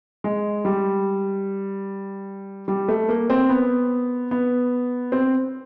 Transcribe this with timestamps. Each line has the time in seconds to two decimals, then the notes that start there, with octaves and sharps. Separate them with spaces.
0.24 G#3
0.65 G3
2.68 G3
2.88 A3
3.08 A#3
3.30 C4
3.49 B3
4.31 B3
5.12 C4